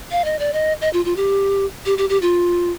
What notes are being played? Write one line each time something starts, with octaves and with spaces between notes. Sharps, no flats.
F5
D#5
D5
D#5
D#5
F4
F4
G4
G4
G4
G4
F4